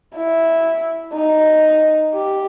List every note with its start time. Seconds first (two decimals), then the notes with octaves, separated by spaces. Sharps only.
0.16 E4
1.14 D#4
2.14 G4